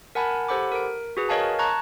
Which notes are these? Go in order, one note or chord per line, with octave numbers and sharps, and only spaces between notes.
A#4 F#5 G#5 A5 B5
G4 A4 C5 F#5 B5 D6
A#4 D7
F#4 G#4 B4
A#4 C#5 D#5 F5 G#5 A5
A5 A#5 C#6 F#6 G#6